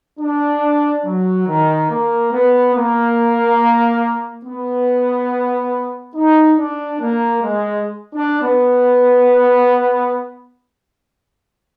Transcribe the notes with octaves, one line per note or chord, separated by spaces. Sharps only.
D4
F#3
D#3
A#3
B3
A#3
B3
D#4
D4
A#3
G#3
D4
B3